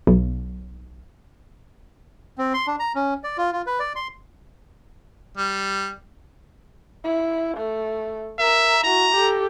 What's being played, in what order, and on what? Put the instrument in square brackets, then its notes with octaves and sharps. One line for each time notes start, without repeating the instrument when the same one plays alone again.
[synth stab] B1
[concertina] C4
C6
D4
A#5
C#4
D5
F4
F4
B4
D5
C6
[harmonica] G3
[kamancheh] E4
A3
[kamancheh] A#4 A#5 [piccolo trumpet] E5
[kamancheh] E4 F#4 [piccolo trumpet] A#5
[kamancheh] G4 A4